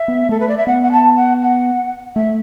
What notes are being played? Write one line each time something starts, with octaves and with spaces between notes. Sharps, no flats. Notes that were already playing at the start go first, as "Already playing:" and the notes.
Already playing: E5
B3
A3 A4
B4
D5
E5
B3 F#5
F#5
A5
F#5
F#5
A3 E5